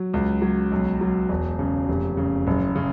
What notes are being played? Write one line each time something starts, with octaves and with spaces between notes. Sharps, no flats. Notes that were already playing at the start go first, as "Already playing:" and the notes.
Already playing: F#3
C#2
F#3
B1
F#3
E1
C#3
F1
C#3
F#1
C#3